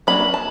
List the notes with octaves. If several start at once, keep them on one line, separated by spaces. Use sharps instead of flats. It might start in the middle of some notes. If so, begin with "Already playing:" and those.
F#3 A#3 D4 B5
A5